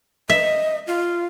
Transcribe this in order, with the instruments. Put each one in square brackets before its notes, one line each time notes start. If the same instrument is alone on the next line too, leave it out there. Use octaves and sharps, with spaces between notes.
[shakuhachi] D#5 [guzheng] E5
[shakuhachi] F4